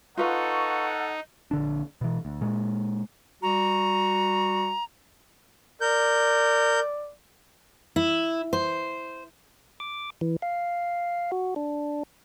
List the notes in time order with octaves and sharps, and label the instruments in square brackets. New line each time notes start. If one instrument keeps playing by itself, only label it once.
[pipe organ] D#4 [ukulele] F4 B4 F5 [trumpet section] A4 F#5 [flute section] C#6
[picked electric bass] A#1 D3 D4
B2 E3
D2
A#2 G#3
[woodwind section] G3 F#4 [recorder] A#5
[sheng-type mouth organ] A#4 G6 [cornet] D5
[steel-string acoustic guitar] E4
C5
[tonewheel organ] D6
E3
F5
F#4
D4